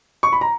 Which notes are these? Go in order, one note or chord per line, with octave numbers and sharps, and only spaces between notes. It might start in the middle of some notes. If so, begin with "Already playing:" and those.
C#6
B5
A#5